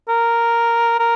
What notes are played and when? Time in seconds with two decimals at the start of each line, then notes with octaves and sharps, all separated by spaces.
0.09 A#4
1.00 A#4